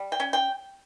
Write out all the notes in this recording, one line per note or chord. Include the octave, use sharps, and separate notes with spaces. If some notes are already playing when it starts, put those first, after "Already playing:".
Already playing: G3
G5
C#4
G5